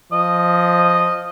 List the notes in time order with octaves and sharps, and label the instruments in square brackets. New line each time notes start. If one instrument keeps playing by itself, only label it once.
[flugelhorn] F3 [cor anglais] D#5